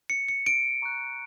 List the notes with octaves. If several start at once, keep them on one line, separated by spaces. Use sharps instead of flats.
C#7
C#7
D7
A#5 C#6 F#6